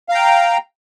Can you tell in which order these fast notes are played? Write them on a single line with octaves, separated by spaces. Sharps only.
F5 A#5 G5